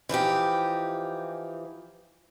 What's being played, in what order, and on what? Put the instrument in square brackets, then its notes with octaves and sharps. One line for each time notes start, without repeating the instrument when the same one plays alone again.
[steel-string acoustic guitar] E3 F3 D#4 G4